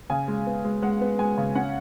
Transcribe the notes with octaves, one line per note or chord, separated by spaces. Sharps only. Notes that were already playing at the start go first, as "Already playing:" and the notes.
C#3 G#5
G#3
B3
G#3
G#3 F#5
B3
G#3 G#5
C#3
C#4 F#5